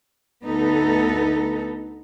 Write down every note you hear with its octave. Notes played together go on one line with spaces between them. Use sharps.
D2 B3 D#4 A4 B4